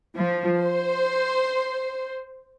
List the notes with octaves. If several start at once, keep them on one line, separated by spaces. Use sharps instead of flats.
F3
C5